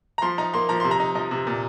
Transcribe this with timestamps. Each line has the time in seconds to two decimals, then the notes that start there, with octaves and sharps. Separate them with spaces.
0.18 A#5
0.22 F3 C6
0.38 D#4 A#5
0.54 A#3 C6
0.69 F3 A#5
0.80 C3 C6
0.91 A#5
1.00 D#4
1.15 F3 D#5
1.31 C3
1.47 A#2